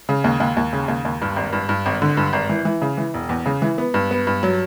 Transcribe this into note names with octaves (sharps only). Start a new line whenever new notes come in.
C#3
D#2
D#2
D#2
C#3
D#2
D#2
G2
G#1
G2
G2
G#1
D3
G2
G#1
E3
E3
C#3
E3
E1
E2
C#3
E3
B3
G2
B3
G2
F#3